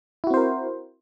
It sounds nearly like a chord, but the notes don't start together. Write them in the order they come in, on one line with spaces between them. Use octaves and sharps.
E4 F#4 C4 C5 A#4